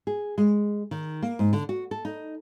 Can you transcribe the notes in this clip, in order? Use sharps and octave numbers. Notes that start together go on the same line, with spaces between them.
G#4
G#3
D#3
A#3
G#2
D3
F#4
A4
D#4